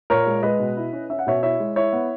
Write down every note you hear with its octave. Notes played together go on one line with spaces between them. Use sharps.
A#2 A#4 C#5
G#3
G#3 B4 D#5
B2
E4
C#4
C#4 E5
F#5
B2 C#5 E5
E4 C#5 E5
G#3
E4 C#5 E5
B3